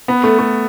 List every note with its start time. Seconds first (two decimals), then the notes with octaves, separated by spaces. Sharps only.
0.08 B3
0.24 A3
0.39 A3